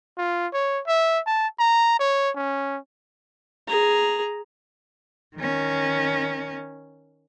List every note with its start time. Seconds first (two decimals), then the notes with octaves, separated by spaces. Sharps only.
0.17 F4
0.53 C#5
0.87 E5
1.26 A5
1.59 A#5
2.00 C#5
2.35 C#4
3.68 G#4 A#5
5.36 D#3 C#4